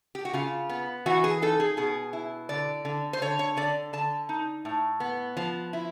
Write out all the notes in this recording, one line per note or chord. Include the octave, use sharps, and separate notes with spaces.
G4
F#4
C#3 F4
B3
E3 F#4
G#4
D#4 A4
G#4
B2 G#4
E4
D3 D5
D3
C5
D3 C#5
C#5
D3 D5
D3 A5
D#4
A2
B3
F3
E4